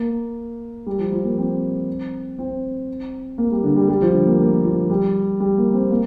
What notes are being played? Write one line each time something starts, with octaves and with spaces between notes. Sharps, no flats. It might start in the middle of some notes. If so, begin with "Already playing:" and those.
Already playing: A#3
G3
F3
F3
A#3
C4
C4
A#3
G3
D3
G3
G3
F3
D3
A#3
A#3
F3
G3
G3
A#3
C4
A#3